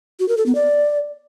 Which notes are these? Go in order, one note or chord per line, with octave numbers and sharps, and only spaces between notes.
F#4
A#4
A4
B3
D5